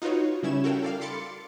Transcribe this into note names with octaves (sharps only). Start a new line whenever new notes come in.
D#4 F4 F#4 B4 C#5
C#3 G3 C#4 E4 G#6 E7
F#4 A4 A#4 F5 G5
A4 D5 F5
B5 C6 D6 A6 C#7